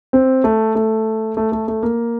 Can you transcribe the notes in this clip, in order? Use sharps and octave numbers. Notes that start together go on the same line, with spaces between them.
C4
A3
A3
A3
A3
A3
A#3